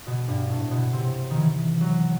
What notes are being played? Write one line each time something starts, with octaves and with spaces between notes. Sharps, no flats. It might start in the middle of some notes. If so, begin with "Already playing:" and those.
B2
G2
A2
B2
C3
D#3
E3
F#3